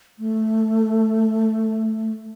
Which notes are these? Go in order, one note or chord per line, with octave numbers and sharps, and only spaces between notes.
A3